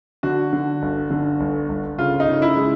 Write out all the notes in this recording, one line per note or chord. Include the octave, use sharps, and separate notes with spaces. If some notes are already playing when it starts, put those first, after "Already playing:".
D3 F#4
D3
G1
D3
G1
G1
C#3 F4
D#4
C#3
E4
G#3